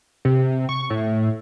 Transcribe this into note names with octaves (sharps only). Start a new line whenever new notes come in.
C3
C#6
A2